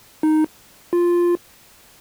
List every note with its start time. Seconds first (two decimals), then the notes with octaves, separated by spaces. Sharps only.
0.23 D#4
0.93 F4